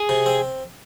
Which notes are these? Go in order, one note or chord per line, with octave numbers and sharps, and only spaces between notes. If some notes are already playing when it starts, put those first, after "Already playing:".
Already playing: G#4
C3
C4